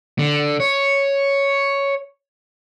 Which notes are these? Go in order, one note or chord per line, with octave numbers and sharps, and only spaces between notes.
D3
C#5